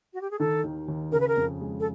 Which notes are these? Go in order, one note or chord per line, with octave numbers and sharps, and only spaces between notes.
F#4
G4
G#4
D#3 A4
D#2
D#2
C#3 A#4
B4
A#4
F2
G#3
A4